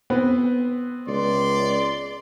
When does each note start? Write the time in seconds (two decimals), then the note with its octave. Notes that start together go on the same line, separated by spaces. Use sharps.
0.10 B3 C4 B4
1.08 C#2 D5 C6